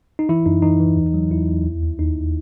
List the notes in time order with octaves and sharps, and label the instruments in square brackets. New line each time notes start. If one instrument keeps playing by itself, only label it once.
[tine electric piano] D#4
E3 E4
F#2 D#4
E3 D#4
E3
E2
F#3
E2 E4
E2
D#2
D#2
D#2 D#4